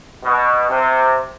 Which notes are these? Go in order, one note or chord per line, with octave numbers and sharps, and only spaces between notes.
B2
C3